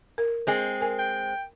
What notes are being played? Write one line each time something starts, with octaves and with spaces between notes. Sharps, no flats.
A#4
G#3 C4 G5 G#5
A#4 G#5
G5